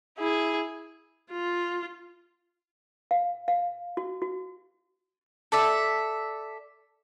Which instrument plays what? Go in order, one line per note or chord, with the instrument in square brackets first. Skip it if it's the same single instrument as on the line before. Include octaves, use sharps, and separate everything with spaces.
[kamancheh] E4 G#4
[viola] F4
[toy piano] F5
F5
F#4
F#4
[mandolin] A4 D5 E5